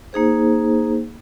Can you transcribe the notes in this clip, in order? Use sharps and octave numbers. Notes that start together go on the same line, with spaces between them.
A#3 D#4 G#4 C5